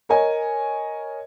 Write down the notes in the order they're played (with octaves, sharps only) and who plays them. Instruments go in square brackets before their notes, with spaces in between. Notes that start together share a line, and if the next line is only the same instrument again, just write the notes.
[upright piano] A#4 C#5 D#5 G#5